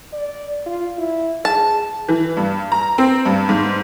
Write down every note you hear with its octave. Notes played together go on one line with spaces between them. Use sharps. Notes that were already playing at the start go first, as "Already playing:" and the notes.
D5
F4
E4
G#4 A5
E3
G2
A#5
C4
G2
G#2